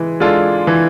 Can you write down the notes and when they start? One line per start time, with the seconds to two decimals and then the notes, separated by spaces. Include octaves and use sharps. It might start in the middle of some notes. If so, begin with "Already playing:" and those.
Already playing: E3 G#3
0.20 G#3 D4 F4 A4
0.67 E3